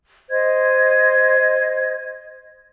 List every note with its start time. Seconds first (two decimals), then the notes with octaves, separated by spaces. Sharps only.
0.30 C5 D#5 G#6